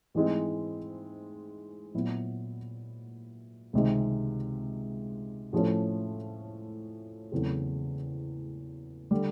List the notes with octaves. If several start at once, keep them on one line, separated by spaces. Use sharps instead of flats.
G#2 E3 G#3 C4
A#2 F#3 B3 E4
C#2 C3 D#3 G#3
A2 F3 A3 C#4
E2 C#3 F#3 A3 C4
D3 G3